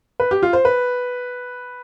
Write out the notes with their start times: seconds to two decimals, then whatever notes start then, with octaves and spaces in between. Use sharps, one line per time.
0.20 B4
0.31 G4
0.43 F4
0.53 C5
0.65 B4